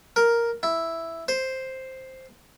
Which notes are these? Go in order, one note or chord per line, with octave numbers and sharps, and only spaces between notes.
A#4
E4
C5